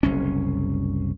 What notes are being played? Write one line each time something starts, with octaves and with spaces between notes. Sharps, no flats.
F#1 C2 C#4